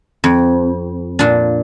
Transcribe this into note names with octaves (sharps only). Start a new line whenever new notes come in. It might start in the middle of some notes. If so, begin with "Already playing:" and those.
F2
A#2 D4